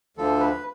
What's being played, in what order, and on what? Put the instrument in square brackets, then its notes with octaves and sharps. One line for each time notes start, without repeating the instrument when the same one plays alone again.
[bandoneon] D2 D3 F3 A4
B4